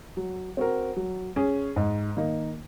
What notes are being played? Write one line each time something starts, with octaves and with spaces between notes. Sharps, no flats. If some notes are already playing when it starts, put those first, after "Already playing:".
F#3
C4 F#4 A#4
F#3
C#4 G#4
G#2
D#3 A#3 D#4